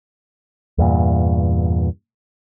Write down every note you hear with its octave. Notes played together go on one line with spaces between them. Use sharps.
E2 G2 A#2